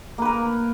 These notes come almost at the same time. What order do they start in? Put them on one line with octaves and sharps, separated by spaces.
A#3 B4 A#4